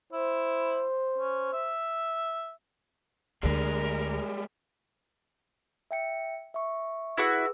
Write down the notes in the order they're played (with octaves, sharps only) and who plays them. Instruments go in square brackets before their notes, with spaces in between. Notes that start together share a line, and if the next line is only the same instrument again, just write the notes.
[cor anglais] E4 [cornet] C5
[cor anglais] C#4
E5
[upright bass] D2 D3 [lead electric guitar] G3 G#3 [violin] A#4
[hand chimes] E5 G5 C#7
E5 C#6
[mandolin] E4 F#4 [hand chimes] G#4 B4 E6